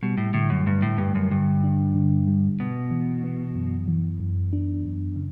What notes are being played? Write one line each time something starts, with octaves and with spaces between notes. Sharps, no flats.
B2 G3
A2
A2 D3
F#2
G2 G3
A2
G2 G3
F#2
G2 D3
D4
D3
G3
B2 B3
E3
B3
F#2
E3
F#2
D4
F#2
C#3